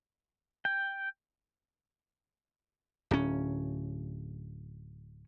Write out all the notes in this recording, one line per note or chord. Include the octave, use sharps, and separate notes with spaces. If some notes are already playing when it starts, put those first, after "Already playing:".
G5
D1 C#4